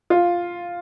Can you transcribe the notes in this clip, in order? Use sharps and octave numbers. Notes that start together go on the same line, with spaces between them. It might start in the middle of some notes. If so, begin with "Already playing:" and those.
F4